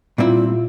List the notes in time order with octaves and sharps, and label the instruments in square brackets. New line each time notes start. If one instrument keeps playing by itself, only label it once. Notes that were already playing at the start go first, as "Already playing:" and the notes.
[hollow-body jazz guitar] A#2 G3 C4 E4 [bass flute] F4